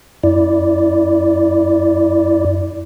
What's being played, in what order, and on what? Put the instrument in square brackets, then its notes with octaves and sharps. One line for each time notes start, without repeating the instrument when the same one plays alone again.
[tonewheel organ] F#2 E4 D5